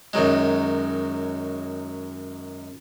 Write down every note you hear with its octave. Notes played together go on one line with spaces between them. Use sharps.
F#2 D#3 F#3 G#3